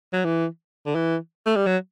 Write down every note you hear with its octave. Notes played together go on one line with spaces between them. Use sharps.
F#3
E3
D3
E3
A3
G3
F#3